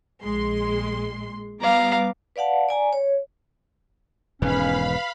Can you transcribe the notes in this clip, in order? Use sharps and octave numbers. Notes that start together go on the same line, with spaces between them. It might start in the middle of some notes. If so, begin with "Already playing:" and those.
A#1 G#3 C6
G3 B3 F5 A#5 D6
B4 D5 F5 F#5 A5
D5 G#5 A#5
C#5
E1 G#2 D#3 C#4 B4 F5 B5